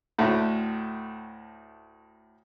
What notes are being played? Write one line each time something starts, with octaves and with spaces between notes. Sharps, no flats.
D2 A2